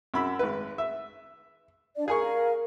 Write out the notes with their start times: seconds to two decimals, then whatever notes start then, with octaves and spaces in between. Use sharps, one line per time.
0.14 F#2 B5 E6
0.39 G#1 B4
0.78 E5
1.96 D4 D5
2.08 G#4 A#4 F5 G#5 C#6